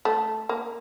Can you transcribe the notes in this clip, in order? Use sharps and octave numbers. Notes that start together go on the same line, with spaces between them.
A3
A#3